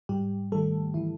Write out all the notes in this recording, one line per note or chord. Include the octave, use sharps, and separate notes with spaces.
G#2 G3 G4
D#3 G3 A3 A4
E3 E4